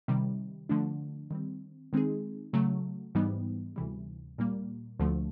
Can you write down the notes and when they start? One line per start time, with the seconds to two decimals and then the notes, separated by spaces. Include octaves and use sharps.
0.08 C3 D#3 G3
0.69 D3 F3 A3 D4
1.31 D#3 G3 C4
1.93 D#3 G#3 C4 D#4 G#4
2.53 C#3 F#3 A3
3.15 G#2 E3 G3 B3 D#4
3.76 D2 C3 E3 G3
4.38 A#2 G3 A#3
4.99 D2 D3 F3 A3